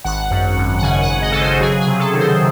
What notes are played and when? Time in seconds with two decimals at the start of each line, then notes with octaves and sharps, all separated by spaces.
0.04 G#1 F#5
0.31 F#2
0.57 G#1
0.78 F#5
0.82 C#3 G#5
1.02 F#5
1.09 F#2
1.22 D#5
1.32 C#3 A4
1.41 C5
1.60 F#3 G#4
1.80 G#4
1.87 C3
1.99 A4
2.13 D#3
2.19 C5